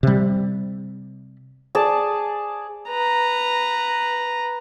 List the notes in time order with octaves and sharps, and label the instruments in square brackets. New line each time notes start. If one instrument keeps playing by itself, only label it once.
[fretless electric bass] C3 G3
[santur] G#4 D5 A5
[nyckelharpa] B4 A#5